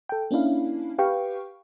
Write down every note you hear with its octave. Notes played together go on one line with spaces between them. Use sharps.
A4 G5
A#3 C#4 D4 E4 F5
G4 B4 F5 G5 C#6